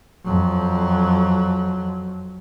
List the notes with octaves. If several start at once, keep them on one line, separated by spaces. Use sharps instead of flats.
F2 F#3